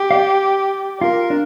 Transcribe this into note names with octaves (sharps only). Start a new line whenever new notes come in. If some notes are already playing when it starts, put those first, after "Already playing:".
Already playing: G4
F5
D5
F4 A#4
D4